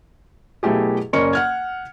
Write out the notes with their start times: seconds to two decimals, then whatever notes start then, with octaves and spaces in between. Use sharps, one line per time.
0.63 B2 F#3 A3 E4 G4 G#4
1.13 F#1 C#4 A#4 D5 C#6 C#7
1.33 F#5 F6 G#6